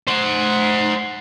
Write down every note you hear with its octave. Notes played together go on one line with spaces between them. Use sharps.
C5 F#5